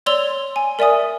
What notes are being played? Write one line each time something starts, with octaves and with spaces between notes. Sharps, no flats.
C#5 D5 C6 E6 F7 G7
G#5
A#4 D5 E5 G#5 D#6